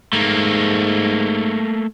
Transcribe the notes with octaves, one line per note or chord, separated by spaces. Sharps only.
G#2 A3 A#3